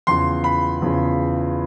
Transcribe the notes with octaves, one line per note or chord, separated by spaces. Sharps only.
E2 C#3 F3 C6
B5
E2 C#3 F3